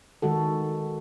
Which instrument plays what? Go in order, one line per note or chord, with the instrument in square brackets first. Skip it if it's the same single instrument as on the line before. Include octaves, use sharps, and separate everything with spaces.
[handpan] D#3 G#3 F#4 A4